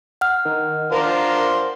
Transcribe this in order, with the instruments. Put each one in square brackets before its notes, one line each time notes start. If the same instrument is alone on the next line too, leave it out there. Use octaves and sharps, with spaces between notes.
[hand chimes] F#5 F6
[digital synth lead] D#3
[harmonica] D4 F4 C5 [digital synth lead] A#4